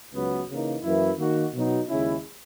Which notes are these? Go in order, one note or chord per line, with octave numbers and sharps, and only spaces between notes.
C#2 C#3 F#3 B3
C#3 E3 A#3 D#4
F#2 E3 A#3 E4
D#3 A#3 D#4 F#4
B2 F#3 B3 D#4
D#2 C#3 G#3 C#4 E4